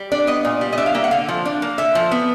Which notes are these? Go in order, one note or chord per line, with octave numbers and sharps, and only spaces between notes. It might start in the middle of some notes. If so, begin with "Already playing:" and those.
Already playing: G3
D4 D5
B3 D#5
A#2
G3
D#5
D4 E5
F5
A#3 E5
F#5
D3 F5
F3
D4
A#3
D3 E5
F3
B3